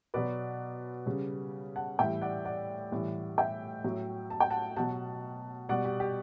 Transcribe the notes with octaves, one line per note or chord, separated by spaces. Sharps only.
B2 F#3 B4 D5
C#3 G3
F#5 A5
A2 E3 G3 E5 G5
D5 F#5
D5 F#5
A2 E3 G3
E5 G5
A2 F#3
A5
G5
F#5 A5
B2 F#3 F#5 A5
B2 G3 D5 F#5
G4
G4